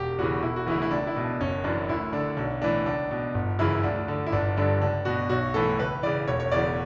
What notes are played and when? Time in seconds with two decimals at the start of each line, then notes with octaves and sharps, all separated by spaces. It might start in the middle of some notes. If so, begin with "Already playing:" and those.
Already playing: E1 G4
0.18 E2 C#3 E3 F#4
0.43 E1 E4
0.56 F#4
0.67 D2 C#3 E3 E4
0.82 E4
0.91 C#2 D4
1.07 E4
1.16 B2
1.24 D4
1.41 F#1 C#4
1.64 F#2 E3 D4
1.89 D2 E4
2.13 D3 D4
2.37 B1 D4
2.62 A2 E3 D4
2.86 C#2 D4
3.11 B2
3.34 G1
3.59 F#2 C#3 E3 E4
3.83 D2 D4
4.08 D3
4.27 E4
4.32 G1 D4
4.57 G2 D3 D4
4.81 C#2 D4
5.05 B2 F#4
5.29 B1 F#4
5.54 A2 E3 A4
5.79 C#2 B4
6.03 C#3 E3 D5
6.27 E1 C#5
6.40 C#5
6.51 E2 C#3 E3 D5